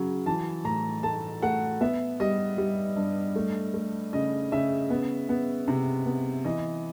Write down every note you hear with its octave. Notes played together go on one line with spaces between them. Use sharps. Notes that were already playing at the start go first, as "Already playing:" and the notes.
Already playing: C#3 F#3
E3 A5
A2 A#5
A3 A5
A3 F#5
B3 E5
G3 D#5
G3
G2
A3
A3
C#3 D#5
C#3 E5
B3
B3
C3
B3
E3 D#5